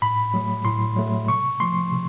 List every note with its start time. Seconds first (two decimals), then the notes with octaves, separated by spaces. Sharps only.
0.02 A2 B5
0.34 F#3 A3
0.65 A2 C6
0.97 F#3 A3
1.28 C3 C#6
1.60 F3 A3 C6
1.92 C3